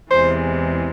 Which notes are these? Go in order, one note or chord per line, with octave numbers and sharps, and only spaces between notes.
E2 C3 E3 G#3 C5